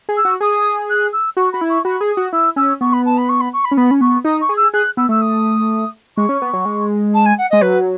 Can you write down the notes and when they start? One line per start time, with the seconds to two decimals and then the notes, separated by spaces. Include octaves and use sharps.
0.09 G#4
0.17 E6
0.25 F#4
0.41 G#4 D#6
0.89 F#6
1.12 E6
1.37 F#4 C#6
1.52 F#4 B5
1.61 E4
1.69 C#6
1.85 F#4 B5
2.01 G#4
2.09 D#6
2.17 F#4
2.32 E4 E6
2.56 C#4 E6
2.81 B3 C#6
2.93 B5
3.05 A5
3.17 B5
3.29 C#6
3.40 B5
3.53 C#6
3.64 B5
3.71 C#4
3.76 B3 B5
3.91 C#4
4.01 B3 C#6
4.25 D#4 D#6
4.41 C#6
4.49 G#4
4.56 E6
4.73 G#4 F#6
4.97 B3 E6
5.09 A3 E6
5.21 D#6
6.17 G#3 C#6
6.29 C#4
6.42 B3
6.53 F#3
6.65 G#3
7.14 A5
7.25 G#5
7.38 F#5
7.50 G#3 D#5
7.61 F#3 B4